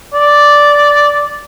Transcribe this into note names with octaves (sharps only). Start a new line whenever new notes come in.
D5